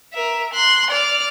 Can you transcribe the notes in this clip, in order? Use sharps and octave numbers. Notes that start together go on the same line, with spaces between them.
A#4 E5
C6 F#6
D5 F6